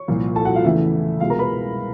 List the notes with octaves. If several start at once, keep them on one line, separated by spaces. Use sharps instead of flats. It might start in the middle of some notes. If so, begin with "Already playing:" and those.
Already playing: C#5 C#6
C2 A#2 F3
A4 A5
F#4 F#5
F4 F5
E2 C#3 E3 A3 E4 E5
C2 B2 G#3 F4 F5
A#4 A#5
B4 B5